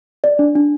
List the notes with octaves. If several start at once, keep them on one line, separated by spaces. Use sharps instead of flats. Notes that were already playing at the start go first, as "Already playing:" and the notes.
D5
D4
D4